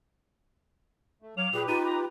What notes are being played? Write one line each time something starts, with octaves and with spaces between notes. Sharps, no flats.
A3
F#3 C#5 F5 D6 F7
A#2 G4 G#4 B4
D#4 F4 D#7
A#5